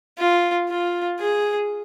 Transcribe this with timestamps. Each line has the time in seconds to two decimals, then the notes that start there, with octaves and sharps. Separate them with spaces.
0.18 F4
0.69 F4
1.19 G#4